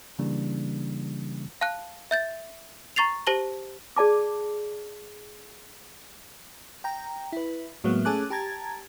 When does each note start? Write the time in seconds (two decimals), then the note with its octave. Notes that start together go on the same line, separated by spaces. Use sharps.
0.19 C#3 E3 G3 A#3 D4
1.61 F5 A5 F#6
2.11 E5 G6 A6
2.96 A#5 C#6 A6 C7 F7
3.27 G4 C5 A5 A#6 F#7 G7
3.96 G#4 D5 A5 D6
6.84 G5 A#5
7.33 E4 B4
7.84 A2 F#3 G#3 A#3 B3
8.05 A3 C#4 G#4 A5 D6 F#6
8.30 G4 A5 A#5 G#6 A6